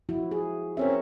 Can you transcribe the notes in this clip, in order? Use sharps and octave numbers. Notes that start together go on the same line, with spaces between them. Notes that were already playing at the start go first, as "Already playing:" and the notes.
F3 E4 F#4
G#4
C4 C#4 A#4 C#5 E5